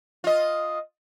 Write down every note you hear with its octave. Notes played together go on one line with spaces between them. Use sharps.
F4 D#5